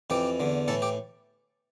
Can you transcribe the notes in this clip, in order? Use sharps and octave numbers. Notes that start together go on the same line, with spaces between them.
F2 E3 G4
E2 D3
A2 E3 A4
G4